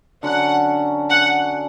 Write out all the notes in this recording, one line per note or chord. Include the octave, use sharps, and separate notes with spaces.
D3 F#3 C#4 F#5
F#5